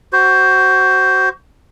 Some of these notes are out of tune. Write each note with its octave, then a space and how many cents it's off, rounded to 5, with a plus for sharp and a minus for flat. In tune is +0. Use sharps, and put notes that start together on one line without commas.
F#4 +20 C5 +0